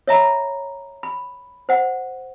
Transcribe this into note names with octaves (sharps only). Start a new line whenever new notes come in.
C#5 E5 A#5 B5
B5
C5 F#5